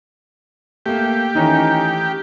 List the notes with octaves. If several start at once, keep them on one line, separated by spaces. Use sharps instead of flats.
A3 A#3 G4
D#3 E3 A3 C#4 D#4